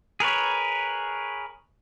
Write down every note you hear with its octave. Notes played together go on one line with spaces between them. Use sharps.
G#4 A#4 B4 C#5